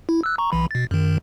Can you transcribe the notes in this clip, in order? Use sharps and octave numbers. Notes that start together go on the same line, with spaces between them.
E4
E6 F#6
A#5 C#6
B1 E3 B5
B2 A6
F#2 D#3